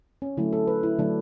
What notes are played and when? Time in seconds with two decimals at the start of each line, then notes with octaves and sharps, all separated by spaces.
0.22 C#4
0.37 D3 F#3 A3 E4
0.53 A4
0.67 B4
0.83 E4
0.99 D3 F#3 A3 D4